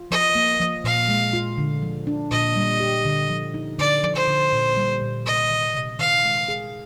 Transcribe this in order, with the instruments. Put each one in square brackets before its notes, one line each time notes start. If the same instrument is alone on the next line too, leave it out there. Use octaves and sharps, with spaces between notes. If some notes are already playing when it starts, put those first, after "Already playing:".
Already playing: [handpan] F4
[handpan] F3 [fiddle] D#5
[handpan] A#3
F3
[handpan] A#2 [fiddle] F5
[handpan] G#3
F4
D3
F3
D4
[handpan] A#2 [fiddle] D#5
[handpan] G3
G4
D3
F3
D#4
[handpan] D3 [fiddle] D5
[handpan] F3
[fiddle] C5
[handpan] D3
A#2
G3
A#2
[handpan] C3 [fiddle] D#5
[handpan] D#3
C3
[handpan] D#3 [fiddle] F5
[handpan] G#3
G#4